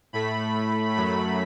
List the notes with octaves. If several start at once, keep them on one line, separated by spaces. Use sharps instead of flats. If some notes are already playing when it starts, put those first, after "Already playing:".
A2 A3 B5
F#2 F#3 A3 B5